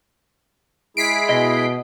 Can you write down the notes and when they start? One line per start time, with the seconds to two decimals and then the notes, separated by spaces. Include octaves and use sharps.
0.97 G#3 E4 G#4 B6 C7 D7
1.29 B2 D#5